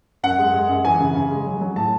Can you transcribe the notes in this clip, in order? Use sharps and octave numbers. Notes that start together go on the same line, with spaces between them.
F#2 F#5
G#3
G#3
F#2
E3 G#5
C#3
C#3
G#3
F#3
F#3
A2 A5